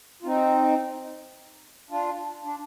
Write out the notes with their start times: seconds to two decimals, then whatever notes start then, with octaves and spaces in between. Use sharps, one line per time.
0.22 F4
0.25 C4 D#4
1.90 D4 F4
2.44 D4